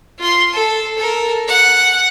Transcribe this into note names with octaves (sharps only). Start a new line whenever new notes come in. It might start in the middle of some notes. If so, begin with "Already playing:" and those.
F4 C6
A4
A4 A#4
F#5